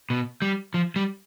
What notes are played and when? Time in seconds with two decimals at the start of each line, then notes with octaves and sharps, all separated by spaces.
0.10 B2
0.42 G3
0.74 F3
0.96 G3